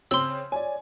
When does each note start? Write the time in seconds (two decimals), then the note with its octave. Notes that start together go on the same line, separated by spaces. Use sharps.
0.11 C#3 C4 C6 E6 F#7
0.52 C#5 D5 G#5